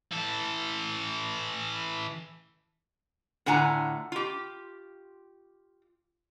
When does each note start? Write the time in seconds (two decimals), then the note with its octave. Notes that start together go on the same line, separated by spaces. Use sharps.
0.12 E3 A4
3.46 A2 D3 F4 F#5 G#5 A#5
4.12 F4 G4